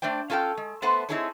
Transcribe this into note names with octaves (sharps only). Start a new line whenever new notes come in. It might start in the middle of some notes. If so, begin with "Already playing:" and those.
A3 D4 C5 D5 G5
C#4 F4 A4 F#5 G5
G#3
A3 B3 A4 C5 F#5
C4 D#4 E4 G#4 A4 C#5